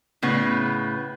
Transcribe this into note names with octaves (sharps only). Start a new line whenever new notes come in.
A2 C#3 B3